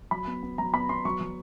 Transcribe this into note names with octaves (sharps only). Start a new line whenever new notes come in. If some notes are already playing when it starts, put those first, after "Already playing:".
F#3 B5
B3
B3
F#3 A#5
B3 B5
B3 C6
F#3 C#6
F#3